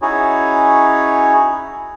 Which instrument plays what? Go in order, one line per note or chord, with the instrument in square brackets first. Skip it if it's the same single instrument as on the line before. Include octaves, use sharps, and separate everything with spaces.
[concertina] C#4 D#4 E4 F#4 G#4 C#5